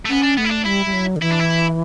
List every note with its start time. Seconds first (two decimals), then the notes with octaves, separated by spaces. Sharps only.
0.05 A3
0.09 B3 C#4
0.23 D4
0.38 A3 B3
0.45 E4
0.51 D4
0.66 G3 E4
0.86 G3
0.93 F#3
1.16 D3
1.21 E3 E4
1.31 D4
1.40 E4